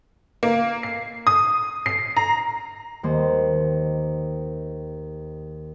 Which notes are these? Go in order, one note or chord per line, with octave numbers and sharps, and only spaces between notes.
A#3
C7
D#6
C7
A#5
D#2 A#3 C5